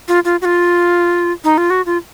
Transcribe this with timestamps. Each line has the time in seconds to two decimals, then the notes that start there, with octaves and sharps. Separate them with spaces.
0.08 F4
0.25 F4
0.42 F#4
0.45 F4
1.44 D#4
1.58 F4
1.70 F#4
1.86 F4